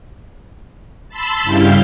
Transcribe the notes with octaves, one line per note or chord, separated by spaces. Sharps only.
A5 B5 C6 E6
G2 C#3 G3 E4 F5 G6